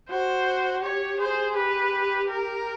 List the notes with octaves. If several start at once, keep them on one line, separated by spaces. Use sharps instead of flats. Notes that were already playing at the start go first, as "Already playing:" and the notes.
F#4 C5
G4 C#5
G#4 C5
G4 B4
A#4